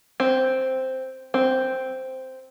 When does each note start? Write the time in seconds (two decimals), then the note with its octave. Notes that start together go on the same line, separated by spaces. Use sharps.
0.20 C4
1.34 C4